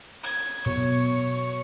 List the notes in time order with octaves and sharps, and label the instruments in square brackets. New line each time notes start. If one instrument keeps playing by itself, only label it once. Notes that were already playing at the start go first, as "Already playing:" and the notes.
[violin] G#6
[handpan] B2 [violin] C#5 C#6